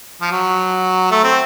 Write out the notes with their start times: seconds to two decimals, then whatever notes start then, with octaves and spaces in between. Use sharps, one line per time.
0.21 F3
0.32 F#3
1.11 A3
1.24 C4